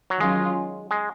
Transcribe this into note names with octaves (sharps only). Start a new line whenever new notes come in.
F#3
D#3 F#3 G#3 C#4 F4
G#3